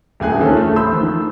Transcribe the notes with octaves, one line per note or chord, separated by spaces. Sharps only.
D#1 D2 G#4 G#5 F#6
D#3 C#4 F4 A4 A#4 C5
A3
B5 C6 E6 F#6 G6
D#3 F3